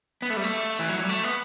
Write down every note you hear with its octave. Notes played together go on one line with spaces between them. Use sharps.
B3
A3
G3
A3
E3
F#3
G3
A3
B3